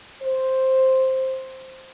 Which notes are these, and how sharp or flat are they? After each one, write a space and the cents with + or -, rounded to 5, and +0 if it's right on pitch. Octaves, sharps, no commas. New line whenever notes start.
C5 +5